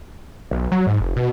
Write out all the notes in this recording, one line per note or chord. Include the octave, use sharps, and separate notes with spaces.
B1
F#3
G#2
F1
B2